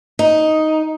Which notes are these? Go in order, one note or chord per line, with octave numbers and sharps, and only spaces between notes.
D#4